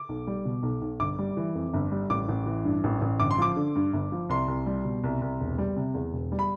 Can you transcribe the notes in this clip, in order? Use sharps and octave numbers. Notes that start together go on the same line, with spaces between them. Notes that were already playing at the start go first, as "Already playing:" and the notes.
Already playing: D6
B1
G3
B2
B1
B1
G1 D6
G3
E3
F2
G1
G3
A1 D6
A1
E3
G2
A1
A1
G1 D6
C6
F3 D6
D3
G2
G1
F3
C2 C6
C2
G3
B2
C2
C2
E1
G3
C3
E2
E1
G3
B5